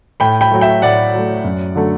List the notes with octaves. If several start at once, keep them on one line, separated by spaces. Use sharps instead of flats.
A2 G5 B5
G5 B5
F#3 A3
E5 G5
A2 D5 F#5
F#3 A3
F#2
D3 F#3 A3